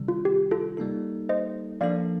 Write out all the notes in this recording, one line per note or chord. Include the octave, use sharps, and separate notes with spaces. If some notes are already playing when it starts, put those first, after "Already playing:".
Already playing: C3 D#3 G3
F4
G4
F4 A4
G3 A#3 D#4 A4
C5 D#5
F3 A#3 D4 A4 D5 F5